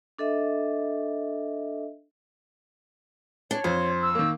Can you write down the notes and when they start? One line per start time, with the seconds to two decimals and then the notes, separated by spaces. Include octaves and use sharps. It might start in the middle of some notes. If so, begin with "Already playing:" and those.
0.19 D4 A4 D#5 E5
3.51 D4 C#5
3.64 F2 C5
4.02 E6
4.15 D#3 A#3